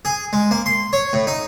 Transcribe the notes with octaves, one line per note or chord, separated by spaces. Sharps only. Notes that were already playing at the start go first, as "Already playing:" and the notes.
G#4
G#3
A#3
C6
C#5
A2
D#4